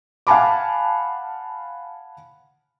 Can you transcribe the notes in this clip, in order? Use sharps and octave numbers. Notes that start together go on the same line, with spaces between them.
F5 F#5 G#5 A5 B5 D6